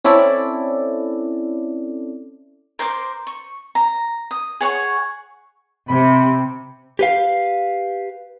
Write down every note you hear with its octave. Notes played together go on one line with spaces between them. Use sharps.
C4 C#4 E4 A4 D5
A#4 C5 C6 D6
C#6
A#5
D#6
G#4 C#5 F#5 C#6
C3 B5
G4 B4 F5